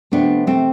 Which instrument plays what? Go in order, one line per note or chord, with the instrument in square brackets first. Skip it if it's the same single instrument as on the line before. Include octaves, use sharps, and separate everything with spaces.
[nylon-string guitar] C3 F3 A3 B3 D4
A3 C4